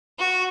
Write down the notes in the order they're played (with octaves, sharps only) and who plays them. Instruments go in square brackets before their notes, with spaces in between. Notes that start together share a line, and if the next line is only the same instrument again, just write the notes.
[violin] F#4